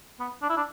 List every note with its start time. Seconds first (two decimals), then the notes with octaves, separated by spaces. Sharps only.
0.20 B3
0.42 D4
0.50 E4
0.57 D4